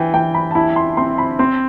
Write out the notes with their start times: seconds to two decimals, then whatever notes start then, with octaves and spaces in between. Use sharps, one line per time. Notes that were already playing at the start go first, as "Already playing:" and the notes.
Already playing: E3 G5
0.14 E3 G5
0.34 B5
0.51 A5
0.55 E4 B5
0.76 C6
0.97 C4 C6
1.18 B5
1.39 C4 C6